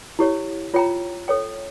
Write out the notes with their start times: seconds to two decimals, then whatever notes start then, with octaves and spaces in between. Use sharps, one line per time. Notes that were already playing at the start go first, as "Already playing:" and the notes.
0.19 E4 G4 C#5
0.74 F4 C#5 G5 A#5
1.28 A4 C#5 G5